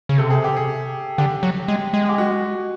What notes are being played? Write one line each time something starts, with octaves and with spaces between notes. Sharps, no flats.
C#3
C3 A4
G#4
G4
G#4
D3 G4
F#3
G#3
G#3
G4
F#4